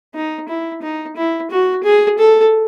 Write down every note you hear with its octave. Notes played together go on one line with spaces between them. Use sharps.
D#4
E4
D#4
E4
F#4
G#4
A4